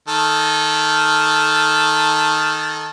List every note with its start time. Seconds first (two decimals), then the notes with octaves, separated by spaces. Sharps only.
0.08 D#3 A4